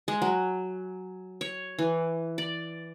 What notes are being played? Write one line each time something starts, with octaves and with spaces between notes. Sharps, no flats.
G#3
F#3
C#5
E3
D5